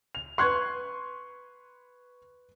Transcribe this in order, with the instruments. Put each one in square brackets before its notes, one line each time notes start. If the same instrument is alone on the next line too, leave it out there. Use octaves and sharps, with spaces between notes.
[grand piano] F7
[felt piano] B4 C6 [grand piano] C#6 F#6 G#6